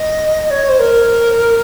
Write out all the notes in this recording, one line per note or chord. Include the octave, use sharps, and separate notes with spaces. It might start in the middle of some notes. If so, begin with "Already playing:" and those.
Already playing: D#5
C#5
C5
A#4